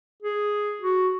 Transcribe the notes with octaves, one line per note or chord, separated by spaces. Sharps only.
G#4
F#4